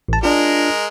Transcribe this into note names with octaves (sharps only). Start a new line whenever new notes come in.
A1 A5
G#3 D4 F4 A#4